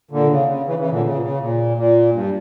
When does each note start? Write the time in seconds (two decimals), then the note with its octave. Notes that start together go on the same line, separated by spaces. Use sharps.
0.11 A#2 D3
0.30 C#3
0.48 C#3
0.66 C#3 E3
0.78 C#3 E3
0.91 A#2 D3
1.03 C#3
1.15 A#2
1.22 C#3
1.40 A#2
1.77 A#2
2.14 G2